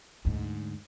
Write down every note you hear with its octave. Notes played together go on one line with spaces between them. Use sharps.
D2 G#2